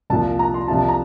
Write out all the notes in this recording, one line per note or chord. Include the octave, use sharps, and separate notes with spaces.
C2 A#2 F3 A5
A#5
C6
C2 C3 F3 A5
A5
A#5